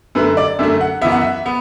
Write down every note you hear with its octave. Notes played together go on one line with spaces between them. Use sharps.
F#2 D3 A3 B4
D5
F#2 D3 A3 E5
F#5
F#2 E3 B3 E5
F#5
E5
B3